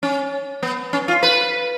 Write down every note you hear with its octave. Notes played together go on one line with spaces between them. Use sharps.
C#4
B3
C#4
F4
B4